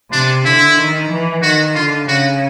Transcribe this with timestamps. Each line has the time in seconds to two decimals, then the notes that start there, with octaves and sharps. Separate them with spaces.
0.12 C3 D4
0.45 D3 E4
0.78 D#3
1.10 E3
1.42 D#3 F#4
1.75 D3 F4
2.08 C#3 F#4